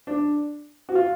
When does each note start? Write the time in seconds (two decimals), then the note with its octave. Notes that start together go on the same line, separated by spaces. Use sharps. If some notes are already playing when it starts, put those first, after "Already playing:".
0.07 D4
0.89 F#4
0.95 F4